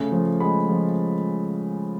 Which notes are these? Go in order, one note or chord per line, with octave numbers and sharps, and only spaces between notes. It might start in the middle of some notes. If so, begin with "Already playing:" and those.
Already playing: C#3 A3
F3
G#3 B5
F3